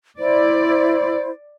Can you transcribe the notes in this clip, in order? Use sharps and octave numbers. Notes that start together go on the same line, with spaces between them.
E4 C5 D5